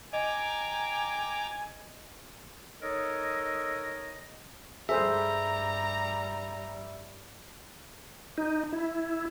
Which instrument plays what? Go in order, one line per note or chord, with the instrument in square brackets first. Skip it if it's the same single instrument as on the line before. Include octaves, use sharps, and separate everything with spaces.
[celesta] D#5 [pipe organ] G5 A#5 D6 [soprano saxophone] G#5
[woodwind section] D#4 A4 A#4 C#5 D#5
[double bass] G2 G3 [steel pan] G#4 A4 C5 [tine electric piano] E5 [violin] A#5
[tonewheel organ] D#4
E4